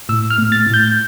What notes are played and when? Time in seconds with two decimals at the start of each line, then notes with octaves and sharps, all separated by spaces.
0.09 A2 E6
0.30 F6
0.38 A2
0.52 A6
0.67 A2
0.74 G6